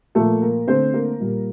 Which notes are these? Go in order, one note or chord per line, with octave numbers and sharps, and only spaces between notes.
A#2 F3 A3 A#3 A4
A#3 A#4
D3 A3 C4 C5
A#3 A#4
A#2 G3 A#3